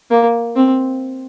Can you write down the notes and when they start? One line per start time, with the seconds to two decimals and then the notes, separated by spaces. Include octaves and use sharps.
0.11 A#3
0.56 C4